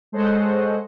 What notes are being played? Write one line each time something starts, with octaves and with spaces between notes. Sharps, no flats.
G#3 A4 C5 C#5 D#5 F#5